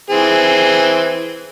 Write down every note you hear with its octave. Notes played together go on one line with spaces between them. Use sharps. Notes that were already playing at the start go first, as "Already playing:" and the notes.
E3 C4 G#4